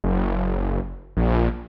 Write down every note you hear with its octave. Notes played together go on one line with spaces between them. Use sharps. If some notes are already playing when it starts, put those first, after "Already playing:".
F#1
A#1